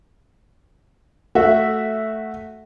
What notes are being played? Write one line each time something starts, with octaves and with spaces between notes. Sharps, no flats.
A3 F#4 E5